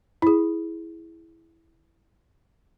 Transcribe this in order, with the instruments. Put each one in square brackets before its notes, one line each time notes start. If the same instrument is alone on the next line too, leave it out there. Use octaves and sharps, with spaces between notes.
[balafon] E4 G#4